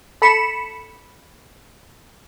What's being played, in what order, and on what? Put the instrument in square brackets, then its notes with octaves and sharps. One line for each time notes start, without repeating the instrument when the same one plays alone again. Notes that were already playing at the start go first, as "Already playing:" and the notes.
[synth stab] A4 B5 C#7 E7